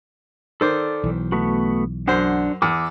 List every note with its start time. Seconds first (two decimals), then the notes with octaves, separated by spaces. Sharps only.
0.61 D#3 A4 C5 D5 D6
1.04 B1 E3
1.32 A3 B3 F#4
2.08 F#2 D4 C5 F#5
2.62 E2 D6 E6